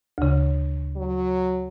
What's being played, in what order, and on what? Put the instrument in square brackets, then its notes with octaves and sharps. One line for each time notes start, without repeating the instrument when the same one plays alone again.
[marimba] D2 C#3
[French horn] F#3